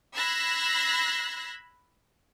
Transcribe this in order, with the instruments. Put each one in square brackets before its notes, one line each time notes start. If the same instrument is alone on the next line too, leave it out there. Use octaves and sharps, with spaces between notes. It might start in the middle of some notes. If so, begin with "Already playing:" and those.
[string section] B5 E6 F#6 G#6 A#6 C7